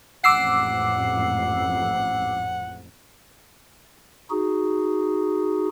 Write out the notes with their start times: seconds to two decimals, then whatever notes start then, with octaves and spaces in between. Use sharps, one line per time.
0.24 A1 F2 G#2 F#5 D6 E6 C7
4.30 D#4 F#4 G#4